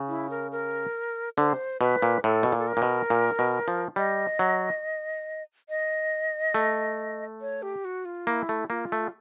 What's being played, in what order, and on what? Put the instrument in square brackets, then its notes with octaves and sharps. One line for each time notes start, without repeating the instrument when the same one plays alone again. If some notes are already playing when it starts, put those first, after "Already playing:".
Already playing: [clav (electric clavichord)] C#3
[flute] E4
A#4
A#4
[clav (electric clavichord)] D3 [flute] C5
[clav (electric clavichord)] B2 [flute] B4
[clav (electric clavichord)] A#2
[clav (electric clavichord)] A2 [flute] A4
[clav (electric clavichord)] B2
A#2
[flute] A4
A#4
[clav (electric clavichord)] A#2
B2
A#2
B2
F3
[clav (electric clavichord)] G3 [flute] D#5
[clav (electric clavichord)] F#3
[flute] D#5
[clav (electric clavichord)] A3
[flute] C#5
G4
F#4
F4
[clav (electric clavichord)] A#3 [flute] E4
[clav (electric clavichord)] A3
[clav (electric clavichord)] A#3 [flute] F4
[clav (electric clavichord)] A3